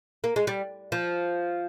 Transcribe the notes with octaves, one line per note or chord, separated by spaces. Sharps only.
A#3
G#3
G3
F3